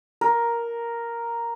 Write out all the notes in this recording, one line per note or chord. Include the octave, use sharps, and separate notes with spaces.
A#4